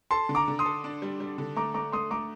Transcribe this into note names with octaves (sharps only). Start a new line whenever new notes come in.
A4 A5 C6
D3
A#5 D6
D3
C6 D#6
A4
D4
G3
G3
D3
A3 A#5 D6
A3 A#5 D6
A3 C6 D#6
A3 A#5 D6